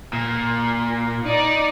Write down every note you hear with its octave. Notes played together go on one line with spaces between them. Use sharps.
A#2
D#4 D5